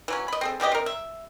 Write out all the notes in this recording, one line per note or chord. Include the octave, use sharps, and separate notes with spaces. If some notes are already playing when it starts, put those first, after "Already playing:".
E3 F#3 C#4
D#5 B5
C4 G#4 A4
C#3 E3 G4 D#5
C4 A#4
E5